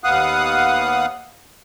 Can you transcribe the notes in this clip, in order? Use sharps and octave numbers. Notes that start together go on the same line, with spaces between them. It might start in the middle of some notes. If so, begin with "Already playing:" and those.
D#2 B3 F5 F#5 D#6 F#6